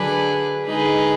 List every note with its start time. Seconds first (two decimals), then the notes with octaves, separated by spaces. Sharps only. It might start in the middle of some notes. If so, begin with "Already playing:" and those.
Already playing: D3 F#3 D4 G#4 B4
0.66 D3 G#3 D#4 G#4 B4